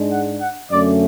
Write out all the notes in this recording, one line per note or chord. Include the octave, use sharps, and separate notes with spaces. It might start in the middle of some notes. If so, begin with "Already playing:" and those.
Already playing: G#2 G#3 D4
F#5
F#5
F#2 D3 A3 C#4 D5